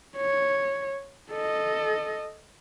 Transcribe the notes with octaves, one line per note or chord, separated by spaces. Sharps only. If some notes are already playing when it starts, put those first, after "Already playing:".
C#5
A4 D#5